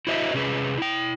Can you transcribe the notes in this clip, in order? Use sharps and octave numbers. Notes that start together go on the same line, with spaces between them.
E4 F#4 C5 D#5 E5
C3 C#4 G#4 B4
E4 G5